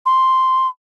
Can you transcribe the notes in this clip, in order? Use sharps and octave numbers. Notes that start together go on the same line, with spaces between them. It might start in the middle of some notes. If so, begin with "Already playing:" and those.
C6